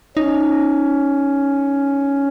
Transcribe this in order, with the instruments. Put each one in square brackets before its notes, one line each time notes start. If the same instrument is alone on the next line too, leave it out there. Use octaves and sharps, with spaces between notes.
[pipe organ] C#4 [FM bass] D#4